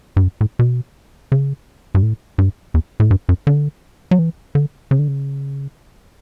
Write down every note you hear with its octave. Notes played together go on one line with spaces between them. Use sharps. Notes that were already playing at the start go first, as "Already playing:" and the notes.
G2
F#2
A2
B2
C#3
G2
A2
G2
E2
A2
G2
F#2
D3
F#3
E3
D3
C#3
D3
C#3